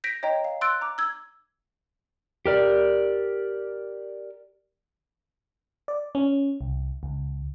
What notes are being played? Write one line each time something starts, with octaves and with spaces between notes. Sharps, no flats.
G6 A#6 B6 D7
C#5 D#5 G5 A#5
F5
C6 E6 F#6 A6 D7
A#5 D6
E6 G#6
G4 A#4 D5
D5
C#4
C2
C#2